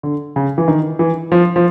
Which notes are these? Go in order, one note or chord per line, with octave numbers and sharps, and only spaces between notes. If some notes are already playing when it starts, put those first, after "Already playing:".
D3
C#3
E3
D#3
E3
F3
F3